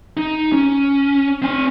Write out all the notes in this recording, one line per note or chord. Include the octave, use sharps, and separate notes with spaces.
D#4
C#4
C4 G#5